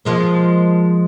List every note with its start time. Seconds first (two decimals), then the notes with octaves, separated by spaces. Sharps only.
0.05 F3 G#3 A#3